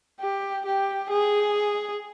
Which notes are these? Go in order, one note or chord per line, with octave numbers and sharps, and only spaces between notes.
G4
G4
G#4